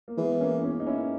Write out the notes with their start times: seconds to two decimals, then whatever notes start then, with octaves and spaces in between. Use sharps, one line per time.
0.08 A#3
0.18 E3 G#3 B3
0.41 A#3 C#4
0.63 A#3 C#4
0.80 D#4
0.86 C#4 E4